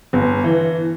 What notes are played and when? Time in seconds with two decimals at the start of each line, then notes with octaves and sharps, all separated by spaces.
0.13 G1
0.44 E3